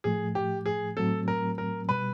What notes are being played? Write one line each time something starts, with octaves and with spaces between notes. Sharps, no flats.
A2 F3 A3 G#4
G4
G#4
A2 F#3 A3 C4 A4
A#4
A#4
B2 G3 B4